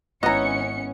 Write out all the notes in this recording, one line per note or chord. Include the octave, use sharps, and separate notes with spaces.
G#1 B3 C#4 E4 D#5 A#5 C#7